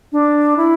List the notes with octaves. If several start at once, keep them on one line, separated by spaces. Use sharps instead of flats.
D4
E4